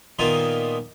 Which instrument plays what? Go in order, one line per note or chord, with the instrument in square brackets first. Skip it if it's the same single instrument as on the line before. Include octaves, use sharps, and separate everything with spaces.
[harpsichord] A#2 D#3 A#3 B3 D#4 F4